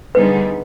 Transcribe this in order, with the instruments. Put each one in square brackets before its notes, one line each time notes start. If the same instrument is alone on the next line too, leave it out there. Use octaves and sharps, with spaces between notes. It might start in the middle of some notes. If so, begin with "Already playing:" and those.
[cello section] D3 G3 B3 D#4 G#4 [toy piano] B4